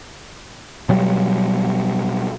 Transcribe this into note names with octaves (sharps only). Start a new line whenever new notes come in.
B2 F#3 G3